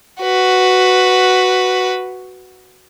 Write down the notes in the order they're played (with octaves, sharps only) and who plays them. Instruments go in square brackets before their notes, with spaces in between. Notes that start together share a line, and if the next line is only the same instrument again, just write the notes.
[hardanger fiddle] F#4 B4